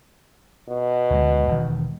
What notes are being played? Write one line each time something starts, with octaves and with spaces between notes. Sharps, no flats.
B2
D2 G#3
E1 D#3